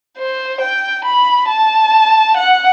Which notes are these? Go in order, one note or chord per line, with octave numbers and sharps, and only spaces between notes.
C5
G5
B5
A5
F#5